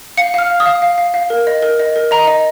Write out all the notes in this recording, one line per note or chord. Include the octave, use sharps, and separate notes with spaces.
F5 C#7
F5 F6
F5
D#6
F5
F5
F5
F5
A#4
D#5
A#4
D#5
A#4
D#5 A#5
D#5